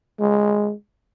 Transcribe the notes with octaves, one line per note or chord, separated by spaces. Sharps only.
G#3